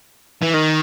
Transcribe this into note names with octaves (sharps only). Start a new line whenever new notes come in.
E3
D#3